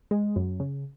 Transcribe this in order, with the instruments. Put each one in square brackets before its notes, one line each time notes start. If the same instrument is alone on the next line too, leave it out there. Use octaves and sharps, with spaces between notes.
[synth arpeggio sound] G#3
F#2
C#3